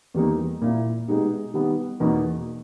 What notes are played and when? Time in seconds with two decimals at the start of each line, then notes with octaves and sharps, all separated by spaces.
0.14 E2 D#3 G3 A#3 D#4
0.61 A#2 A#3 E4
1.08 B2 G#3 D#4 G4
1.54 D#3 G3 B3
2.00 E2 B2 A#3 D#4